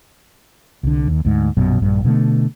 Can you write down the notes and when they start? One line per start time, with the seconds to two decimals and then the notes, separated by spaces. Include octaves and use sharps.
0.83 C2 D3
1.07 D#2
1.25 D2 G#2
1.57 A#1 F#2 B2
1.80 A#1 G2
2.05 B2 D3 E3 A3